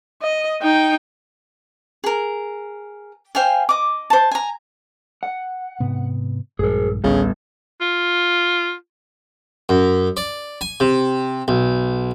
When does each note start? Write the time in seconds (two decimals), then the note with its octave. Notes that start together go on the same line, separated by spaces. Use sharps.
0.22 D#5
0.61 D#4 G5
2.04 G#4 A#4
3.35 C5 F5 G5 G#5
3.69 D#5 D6
4.10 C5 A5
4.31 G#5 A#5
5.23 F#5
5.80 G#2 C3 B3
6.59 A#1 G2 G#3 G#4 A#4
7.04 A1 D2 C#3 G3 B3
7.81 F4
9.69 F#2
10.17 D5
10.61 G#5
10.80 C3
11.48 B1